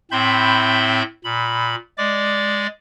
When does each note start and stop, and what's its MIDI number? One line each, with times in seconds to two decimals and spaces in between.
0.11 1.03 45
0.11 1.03 60
0.11 1.03 76
0.11 1.03 83
0.11 1.03 84
0.11 1.03 91
1.25 1.75 46
1.25 1.75 83
1.98 2.67 56
1.98 2.67 74
1.98 2.67 86